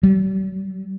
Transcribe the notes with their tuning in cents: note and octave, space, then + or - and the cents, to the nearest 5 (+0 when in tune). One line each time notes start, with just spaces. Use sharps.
G3 -45